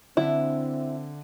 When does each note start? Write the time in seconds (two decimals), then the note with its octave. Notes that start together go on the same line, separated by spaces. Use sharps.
0.17 D3 C4 D4 E4 E5